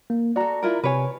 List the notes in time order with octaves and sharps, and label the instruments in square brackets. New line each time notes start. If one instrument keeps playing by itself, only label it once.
[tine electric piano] A#3
[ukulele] F#4 A4 [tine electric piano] D5 A#5
[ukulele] E4 F4 A#4
[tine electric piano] C3 G#5 [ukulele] B4 C#5